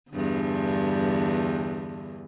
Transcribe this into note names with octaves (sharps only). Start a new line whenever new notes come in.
E2 G2 D3